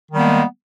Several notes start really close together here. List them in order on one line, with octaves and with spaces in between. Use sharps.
D#3 G3 B3 A#3 G#3